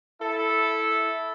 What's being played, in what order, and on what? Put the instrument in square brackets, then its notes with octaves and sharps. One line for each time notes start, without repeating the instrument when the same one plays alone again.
[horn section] E4 A4